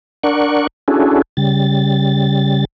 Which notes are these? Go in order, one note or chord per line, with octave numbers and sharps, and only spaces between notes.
D4 A#4 D5 F#5 C#6
C#4 D4 E4 F#4 G#4 A4
C#3 G3 A6